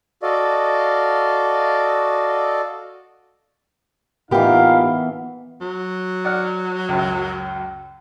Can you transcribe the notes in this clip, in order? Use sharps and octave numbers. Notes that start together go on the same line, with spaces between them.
F#4 A4 D5 D#5 F5
A2 E3 B3 D#4 F4 G4 A#4 F5
F#3
D5 F#5 F6
C#2 F#2